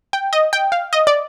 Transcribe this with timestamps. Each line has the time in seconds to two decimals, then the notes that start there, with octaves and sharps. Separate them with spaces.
0.13 G5
0.33 D#5
0.53 G5
0.72 F5
0.93 D#5
1.07 D5